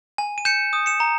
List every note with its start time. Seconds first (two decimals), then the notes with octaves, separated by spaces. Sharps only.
0.18 G#5
0.38 D#7
0.45 G6 C#7 E7
0.73 D#6
0.86 C#7 E7
1.00 A#5